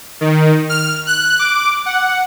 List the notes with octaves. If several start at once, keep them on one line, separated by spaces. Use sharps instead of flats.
D#3
F6
F#6
D6
F#5